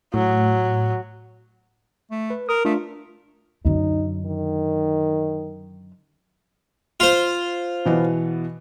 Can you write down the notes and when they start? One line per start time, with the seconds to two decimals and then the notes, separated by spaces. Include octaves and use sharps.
0.14 A2 F#3
2.11 A3
2.30 B4
2.49 A#4 D#6
2.65 A3 D4 F4
3.65 F#2 D3 D#4
4.26 D#3
7.00 F4 C5
7.85 B2 E3 B3